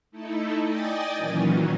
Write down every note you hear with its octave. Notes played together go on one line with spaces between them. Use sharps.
A3 D#4 E4 A4
D5 D#5 G5 G#5 D#6 A6
A#2 D#3 E3 F#3 C#4